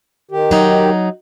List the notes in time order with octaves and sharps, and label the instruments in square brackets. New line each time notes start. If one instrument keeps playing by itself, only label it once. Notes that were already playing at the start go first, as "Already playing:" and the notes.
[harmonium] D#3 G4
[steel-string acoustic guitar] F#3 D#4